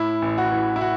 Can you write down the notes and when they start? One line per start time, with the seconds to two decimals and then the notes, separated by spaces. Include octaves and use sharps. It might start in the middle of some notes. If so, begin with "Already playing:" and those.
Already playing: A2 E4
0.22 A1
0.38 F#4
0.52 E3
0.76 E4
0.81 F#4